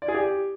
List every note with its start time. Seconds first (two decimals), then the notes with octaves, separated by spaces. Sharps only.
0.02 D5
0.08 G#4
0.15 G4